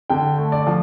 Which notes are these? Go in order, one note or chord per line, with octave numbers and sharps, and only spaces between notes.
D3 G5
A3
D5
F3